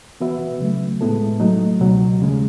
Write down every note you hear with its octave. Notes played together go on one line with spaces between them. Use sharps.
E3 B3 F#4 B4 E5
C#3 F#3 A3
A2 G#3 B3 E4 A4
F#3 A3 D#4
C#2 B2 F#3
D#2 C#3 G#3